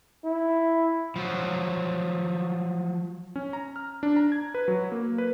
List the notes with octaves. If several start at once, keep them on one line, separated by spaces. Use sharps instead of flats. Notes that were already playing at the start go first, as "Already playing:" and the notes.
E4
F3 F#3
C#4
A#5
F6
D4
A#5
G#6
B4
F#3
A#3
B4